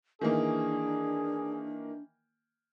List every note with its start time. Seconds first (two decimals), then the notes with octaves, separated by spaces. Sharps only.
0.21 D#3 E3 A#3 D4 G#4